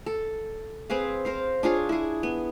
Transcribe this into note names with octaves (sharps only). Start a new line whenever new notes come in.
A4
C4 G#4 B4 F5
A#4 C5 F5
D4 F4 G#4 C#5
E4 G#4
B3